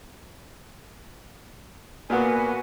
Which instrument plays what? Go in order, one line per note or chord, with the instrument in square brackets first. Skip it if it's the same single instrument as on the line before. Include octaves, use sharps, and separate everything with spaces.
[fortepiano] A#2 A#3 B3 [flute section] F#4 B4 G#5